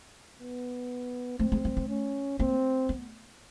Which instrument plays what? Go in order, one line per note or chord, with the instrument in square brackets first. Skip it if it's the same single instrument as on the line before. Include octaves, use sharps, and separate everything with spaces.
[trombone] B3
[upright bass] A3 [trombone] C4
[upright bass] G#3
G3
A3
[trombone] C#4
[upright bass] A#3 [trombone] C4
[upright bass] B3